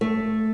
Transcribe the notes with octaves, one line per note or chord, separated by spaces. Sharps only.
A3